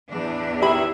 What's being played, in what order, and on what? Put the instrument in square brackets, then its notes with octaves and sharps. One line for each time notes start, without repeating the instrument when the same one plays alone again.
[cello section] E2 A2 D4
[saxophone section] D#3 G#4 E5 [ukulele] E4 B5 [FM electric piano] G4